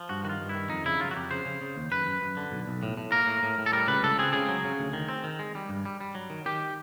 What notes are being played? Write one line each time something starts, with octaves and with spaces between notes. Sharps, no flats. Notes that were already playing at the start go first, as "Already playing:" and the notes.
Already playing: F3
G2 F#4
D#3 F#4
F4
G2
E4
D#3
F2 D#4
C#3 E4
F#3 F4
F#4
F2 G4
C#3 C5
C#3
C#3
D#2
F#2 B4
F#2
F#2
D3
B1
B1
A2
A2
A#3 A#4
A2
A2
A2
A4
G3 A#4
C#2 B4
C#2 A4
C4 G#4
C#3 G#4
F#3
C#3
D2
D#3
C4
D#3
G#3
G3
G2
G3
G3
F#3
D#3
D#3 G4